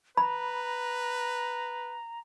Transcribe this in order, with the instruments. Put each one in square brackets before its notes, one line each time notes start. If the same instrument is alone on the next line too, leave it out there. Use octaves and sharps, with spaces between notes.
[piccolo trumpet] B4 [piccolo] A#5 [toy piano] B5